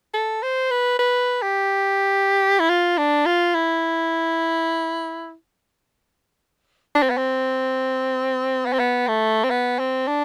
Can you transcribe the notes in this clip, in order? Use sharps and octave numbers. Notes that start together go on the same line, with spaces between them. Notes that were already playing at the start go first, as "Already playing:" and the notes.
A4
C5
B4
B4
G4
E4
F4
D4
F4
E4
D4
C4
B3
C4
B3
C4
B3
A3
C4
B3
C4
D4